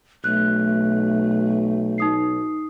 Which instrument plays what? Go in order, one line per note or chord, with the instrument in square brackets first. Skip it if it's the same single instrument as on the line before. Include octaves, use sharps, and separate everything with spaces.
[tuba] B1 [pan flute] A3 [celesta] F#6
[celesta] D#4 D#6 C7